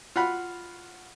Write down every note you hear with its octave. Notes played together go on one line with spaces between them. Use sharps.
F4 F#4 F#5 B5